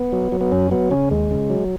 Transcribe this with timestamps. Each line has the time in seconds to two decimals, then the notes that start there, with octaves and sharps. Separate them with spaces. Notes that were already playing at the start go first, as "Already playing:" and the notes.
Already playing: B3
0.12 F#3
0.32 F#3
0.41 B3
0.52 F#2 C#4
0.71 F#3 B3
0.91 C#3 C#4
1.11 D#2 G#3
1.31 C#3
1.50 F#3